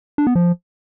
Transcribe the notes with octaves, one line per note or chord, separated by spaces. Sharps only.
D4
B3
F3